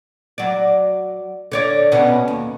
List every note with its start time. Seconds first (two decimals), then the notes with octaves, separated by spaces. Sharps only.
0.38 F#3 D5
1.52 D3 C#5 D5
1.92 B2 B3 C#4
2.28 D#2